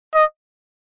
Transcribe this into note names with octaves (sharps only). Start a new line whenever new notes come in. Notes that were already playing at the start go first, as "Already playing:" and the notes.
D#5